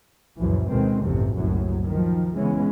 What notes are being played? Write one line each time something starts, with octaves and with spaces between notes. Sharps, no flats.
C#2 F#2 A#2 E3 F3
D2 B2 D#3 G#3 C4
A1 E2 G2 C3 F3
F#1 C2 F#2 A2 F#3
D#3 F3
C#3 E3 G#3 B3 C#4